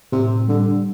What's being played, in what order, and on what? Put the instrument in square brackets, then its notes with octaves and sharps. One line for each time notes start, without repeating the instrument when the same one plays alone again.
[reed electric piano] A2 [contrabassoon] C3
[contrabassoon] D3 [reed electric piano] G3